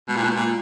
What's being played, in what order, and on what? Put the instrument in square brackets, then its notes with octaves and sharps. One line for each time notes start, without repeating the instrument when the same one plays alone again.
[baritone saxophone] B2 [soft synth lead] G#3
[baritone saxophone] A#2
B2
A#2